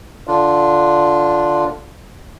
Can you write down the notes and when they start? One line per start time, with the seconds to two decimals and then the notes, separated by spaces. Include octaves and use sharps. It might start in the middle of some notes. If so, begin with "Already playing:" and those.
0.27 D3 D4 F4